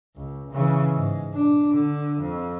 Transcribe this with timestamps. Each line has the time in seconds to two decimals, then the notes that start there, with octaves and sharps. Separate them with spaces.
0.16 C#2
0.52 C#3 E3
0.94 G#2
1.34 D4
1.72 D3
2.21 F2